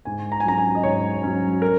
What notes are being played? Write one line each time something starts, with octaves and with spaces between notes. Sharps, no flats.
G#2 G#5
A#5
G#5
F#3 C#4 A#5
G#5
D#5
G#2 C#5
F#3 C#4
A#4